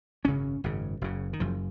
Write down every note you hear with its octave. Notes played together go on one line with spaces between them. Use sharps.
G#1 F#2 C#3 C#4
G#1 F#2 C#3
F#1 F#2 C#3
D#3
F#1 F#2 C#3 F3